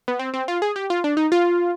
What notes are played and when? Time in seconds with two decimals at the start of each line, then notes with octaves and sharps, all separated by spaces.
0.08 B3
0.19 C4
0.34 C4
0.48 F4
0.62 G#4
0.76 G4
0.90 F4
1.04 D4
1.17 D#4
1.32 F4